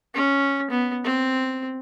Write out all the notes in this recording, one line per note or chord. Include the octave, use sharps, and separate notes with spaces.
C#4
B3
C4